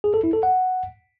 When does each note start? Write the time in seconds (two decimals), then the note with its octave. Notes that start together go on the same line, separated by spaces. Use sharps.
0.04 G#4
0.14 A4
0.24 E4
0.33 A4
0.43 F#5